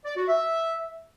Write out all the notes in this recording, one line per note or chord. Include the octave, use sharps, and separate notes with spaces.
D5
F#4
E5